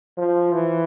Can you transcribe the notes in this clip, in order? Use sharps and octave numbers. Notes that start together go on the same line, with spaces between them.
F3
E3